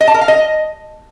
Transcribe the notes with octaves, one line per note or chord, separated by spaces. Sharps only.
D#5
A5
A#4
F5
D#5